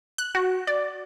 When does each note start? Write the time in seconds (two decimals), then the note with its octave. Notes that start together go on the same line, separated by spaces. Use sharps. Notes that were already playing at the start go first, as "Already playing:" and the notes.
0.18 F#6
0.35 F#4
0.67 D5